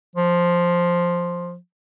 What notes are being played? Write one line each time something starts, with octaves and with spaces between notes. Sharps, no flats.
F3